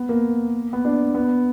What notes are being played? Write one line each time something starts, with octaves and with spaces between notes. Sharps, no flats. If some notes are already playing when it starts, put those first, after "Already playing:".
Already playing: B3
A#3
B3
D4
B3